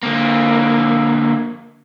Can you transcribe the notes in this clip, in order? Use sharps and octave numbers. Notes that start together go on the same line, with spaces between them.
D3 A#3